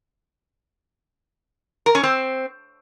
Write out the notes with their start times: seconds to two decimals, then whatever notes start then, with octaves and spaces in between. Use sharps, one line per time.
1.86 A#4
1.95 C#4
2.03 C4